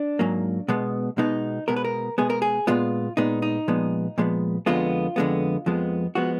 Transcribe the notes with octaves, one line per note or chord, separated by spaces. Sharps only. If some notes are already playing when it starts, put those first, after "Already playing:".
Already playing: D4
G#2 F#3 A#3
B2 G#3 B3
B2 G#3 B3 D#4
B2 G#3 B3 A#4
B4
A#4
B2 G#3 B3 G#4
A#4
G#4
A#2 G#3 B3 F4
A#2 G#3 B3 D#4
D#4
A#2 F3 G#3 B3
A#2 F3 G#3 B3
F2 D3 G#3 B3 F4
F2 D3 G#3 B3
F2 F3 G#3 B3
F3 G#3 B3 F#4